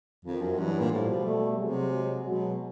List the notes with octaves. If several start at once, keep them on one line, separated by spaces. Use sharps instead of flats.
F2 D#3 F3
F#2
G2 E3 F#3
A#2
A2 F3 G3
B2
G3 A3
C3 F#3 G#3
F#3 G#3
B2 F#3 G#3